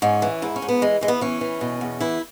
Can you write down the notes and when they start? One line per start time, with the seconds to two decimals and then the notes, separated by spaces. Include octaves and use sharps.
0.02 G#2 C#4
0.22 E3
0.42 G#2 E4
0.56 C#4
0.62 G#2
0.69 B3
0.81 E3 G#3
1.01 E3 G#3
1.08 B3
1.21 E3 C#4
1.41 E3
1.61 B2
1.81 E2
2.00 E3 E4